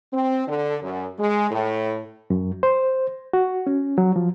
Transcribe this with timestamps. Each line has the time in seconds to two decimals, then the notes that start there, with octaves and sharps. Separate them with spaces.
0.12 C4
0.47 D3
0.82 F#2
1.19 G#3
1.51 A2
2.30 F#2
2.63 C5
3.33 F#4
3.67 C#4
3.98 F#3
4.16 F3